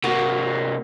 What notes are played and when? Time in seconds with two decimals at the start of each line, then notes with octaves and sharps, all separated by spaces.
0.04 C3 A#3 F#4